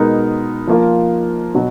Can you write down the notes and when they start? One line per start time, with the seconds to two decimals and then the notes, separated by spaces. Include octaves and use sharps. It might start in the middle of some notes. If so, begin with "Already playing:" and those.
Already playing: B2 G#3 B3 D#4 A#4
0.67 F3 A#3 F4
1.55 B2 F#3 F#4